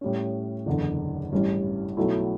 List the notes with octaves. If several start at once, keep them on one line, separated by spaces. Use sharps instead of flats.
A2 G3 C#4
F#1 E2 D3
A1 G2 E3 G3 C#4
B1 B2 F#3 A3 E4